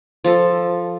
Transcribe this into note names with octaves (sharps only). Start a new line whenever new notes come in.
F3 A4